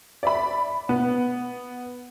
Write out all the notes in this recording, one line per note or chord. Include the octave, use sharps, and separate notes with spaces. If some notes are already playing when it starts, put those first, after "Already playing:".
D5 E5 B5
B3